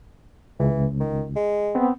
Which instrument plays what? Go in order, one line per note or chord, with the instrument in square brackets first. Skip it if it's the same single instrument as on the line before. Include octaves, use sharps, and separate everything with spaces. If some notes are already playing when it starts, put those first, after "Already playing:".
[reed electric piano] C#2 [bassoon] E3
[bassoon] D#3
G#3
[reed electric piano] B3 C4